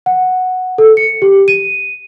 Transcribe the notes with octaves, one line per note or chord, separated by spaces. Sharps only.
F#5
A4
C#7
G4
D#7